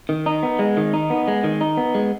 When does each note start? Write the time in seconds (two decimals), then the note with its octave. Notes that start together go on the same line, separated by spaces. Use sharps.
0.09 D#3
0.26 D#4
0.43 B3
0.59 G#3
0.77 D#3
0.94 D#4
1.10 B3
1.28 G#3
1.44 D#3
1.61 D#4
1.77 B3
1.94 G#3